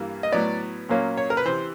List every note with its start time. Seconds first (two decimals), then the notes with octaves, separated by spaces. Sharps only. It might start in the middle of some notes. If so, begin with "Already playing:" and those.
Already playing: G2 E3 G3 A#3
0.23 D#5
0.32 A2 F#3 B3 D5
0.89 A#2 F#3 A#3 C#4
1.18 C#5
1.30 A#4
1.37 B4
1.45 C3 E3 C5